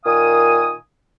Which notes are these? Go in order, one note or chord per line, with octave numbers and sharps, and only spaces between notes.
A#2 D#3 F5 G#5 D#6